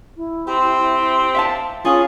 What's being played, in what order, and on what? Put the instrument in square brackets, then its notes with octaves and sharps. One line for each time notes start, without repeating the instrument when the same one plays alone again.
[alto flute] E4
[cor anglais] C4 [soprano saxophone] G4
[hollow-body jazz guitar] E5 F5 A5
[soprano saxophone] C#4 [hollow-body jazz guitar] F4 [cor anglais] G#4 [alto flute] F5